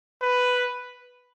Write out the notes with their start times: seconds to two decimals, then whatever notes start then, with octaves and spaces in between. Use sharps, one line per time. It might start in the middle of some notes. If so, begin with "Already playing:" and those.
0.21 B4